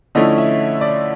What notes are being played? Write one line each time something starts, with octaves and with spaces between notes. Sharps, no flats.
D3 F3 A3 C#4 E4 D#5
E5
D5